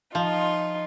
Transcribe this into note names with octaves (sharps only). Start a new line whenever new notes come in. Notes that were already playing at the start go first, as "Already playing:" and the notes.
F3 D#4 F4